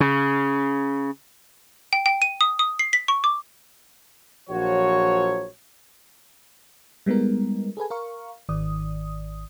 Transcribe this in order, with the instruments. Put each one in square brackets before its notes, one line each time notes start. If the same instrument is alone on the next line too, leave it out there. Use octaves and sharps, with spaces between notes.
[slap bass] C#3
[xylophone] G5
G5
D#7
D#6
D#6
C7
B6
C#6
D6
[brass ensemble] A#1 F3 F#3 F#4 C#5
[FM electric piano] G3 G#3 B3 D#4 A#4
G#4 A4 B4 G#5
A#4 F5 C#6
G#1 D#3 D5 D#6